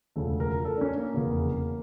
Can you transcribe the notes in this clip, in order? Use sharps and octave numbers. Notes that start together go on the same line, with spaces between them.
E1 D2 C#3 F3 A4
A#4
A4
D4
C#4
A#3
F1 E2 C#3